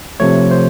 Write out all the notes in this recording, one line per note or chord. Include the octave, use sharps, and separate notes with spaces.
C3 F3 A3 C#5
C5